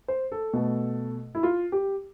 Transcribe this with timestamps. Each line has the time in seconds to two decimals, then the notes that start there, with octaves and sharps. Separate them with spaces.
0.08 C5
0.32 A4
0.53 B2 A3
1.35 E4
1.43 F4
1.72 G4